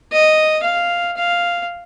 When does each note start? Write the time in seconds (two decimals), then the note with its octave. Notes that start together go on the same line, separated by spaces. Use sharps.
0.12 D#5
0.64 F5
1.17 F5